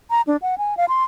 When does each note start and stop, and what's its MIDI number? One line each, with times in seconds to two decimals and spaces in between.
0.11 0.22 82
0.27 0.37 62
0.42 0.58 78
0.58 0.77 80
0.77 0.85 77
0.89 1.04 84